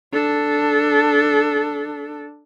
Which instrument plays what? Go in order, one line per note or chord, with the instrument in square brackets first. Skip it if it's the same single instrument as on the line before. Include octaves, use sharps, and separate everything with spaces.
[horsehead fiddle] D4 A4